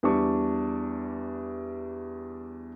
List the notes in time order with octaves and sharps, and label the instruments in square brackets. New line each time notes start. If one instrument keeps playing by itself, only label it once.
[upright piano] E2 G3 D4 C#6